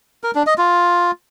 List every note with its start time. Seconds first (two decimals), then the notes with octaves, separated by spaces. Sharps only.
0.24 A#4
0.35 D4
0.47 D#5
0.58 F4